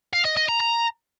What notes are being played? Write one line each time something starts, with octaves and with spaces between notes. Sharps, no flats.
F5
D#5
D#5
A#5
A#5